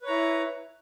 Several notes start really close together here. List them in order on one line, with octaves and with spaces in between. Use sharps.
B4 C#5 A#5 E4